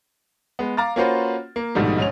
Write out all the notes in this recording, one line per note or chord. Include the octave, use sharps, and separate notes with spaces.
G#3 B3
F5 A#5 D6 A6
A#3 C#4 F4 F#4 B4 C5
A#3
A#1 G#2 B2 D#3 G3 A3
G#2 C#4 F7